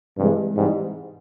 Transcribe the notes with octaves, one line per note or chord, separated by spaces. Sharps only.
G2 C3 E3 G#3
G#2 C3 E3 G3